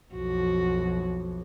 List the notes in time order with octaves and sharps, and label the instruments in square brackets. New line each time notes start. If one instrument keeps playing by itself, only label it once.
[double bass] B1 F2 [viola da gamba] F#4